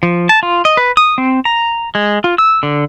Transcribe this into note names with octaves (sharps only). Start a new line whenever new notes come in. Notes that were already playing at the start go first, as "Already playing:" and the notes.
F3
A5
F4
D#5
B4
D#6
C4
A#5
G#3
F4
E6
D3